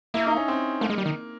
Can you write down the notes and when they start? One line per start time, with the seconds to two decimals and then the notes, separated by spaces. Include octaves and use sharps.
0.14 A#3 E4
0.26 D#4
0.37 C#4
0.48 C4
0.81 A3 A#3
0.90 G#3
0.98 G3
1.06 D#3